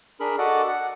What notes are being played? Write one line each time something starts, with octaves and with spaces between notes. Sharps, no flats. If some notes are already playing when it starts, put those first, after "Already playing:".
D4 G#4 A#4 B5
F#4 A4 D5 D#5 F#5
F#5